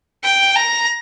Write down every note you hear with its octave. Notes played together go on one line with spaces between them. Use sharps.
G5
A#5